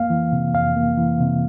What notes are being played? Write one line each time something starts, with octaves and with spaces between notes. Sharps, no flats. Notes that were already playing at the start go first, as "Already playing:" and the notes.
Already playing: F2 A#3 F5
E3
C3
F2 F5
A#3
E3
C3